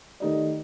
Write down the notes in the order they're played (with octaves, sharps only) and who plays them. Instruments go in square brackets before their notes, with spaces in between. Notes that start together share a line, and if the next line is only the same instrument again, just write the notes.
[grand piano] D#3 A3 D#4 G4 D5